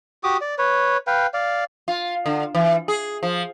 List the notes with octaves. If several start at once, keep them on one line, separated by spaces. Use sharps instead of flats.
F#4 G4 D6 D#6
D5
B4 C#5
B4 F5 G5
D5 F5
F4
D3
E3
G#4
F3